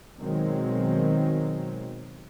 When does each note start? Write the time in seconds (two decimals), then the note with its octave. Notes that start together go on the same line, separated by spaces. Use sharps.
0.18 B2 D#3 F#3 G#3 C4